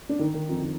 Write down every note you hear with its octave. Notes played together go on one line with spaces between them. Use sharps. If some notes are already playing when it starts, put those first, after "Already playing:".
D4
D#3 D#4
D#3 D#4
F2 F3
D#3